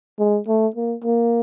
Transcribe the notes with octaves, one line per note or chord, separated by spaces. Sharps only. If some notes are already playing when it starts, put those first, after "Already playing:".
G#3
A3
A#3
A#3